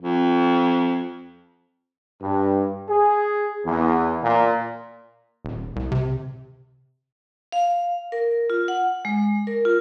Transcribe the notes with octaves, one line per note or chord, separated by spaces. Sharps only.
F2
G2
G#4
E2
A#2
D#1
C2
C3
F5
A#4
F4
F#5
G#3
A#4
F4